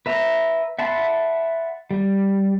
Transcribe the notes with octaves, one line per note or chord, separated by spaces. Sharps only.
B4 E5 A#5
E5 F#5 A5 B5 C6
G3